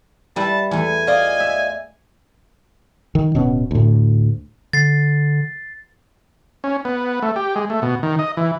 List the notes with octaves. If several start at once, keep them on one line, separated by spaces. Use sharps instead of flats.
G3 E4 B4 A5
E2 A3 G#5
F4 D5 D#5
E5
D#3
D1 B2 B3 C#4
D2 A2
D3 A6 C7
C#4
B3
A3
G4
G#3
A3
B2
D#3
D#5
E3